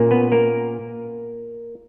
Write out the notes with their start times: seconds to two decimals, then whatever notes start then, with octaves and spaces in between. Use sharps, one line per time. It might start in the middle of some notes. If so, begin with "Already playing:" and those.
Already playing: A#2 A#3 C#4
0.11 B3 B4
0.32 A#3 A#4